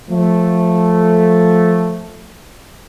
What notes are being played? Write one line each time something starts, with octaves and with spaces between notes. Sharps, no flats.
F3 A3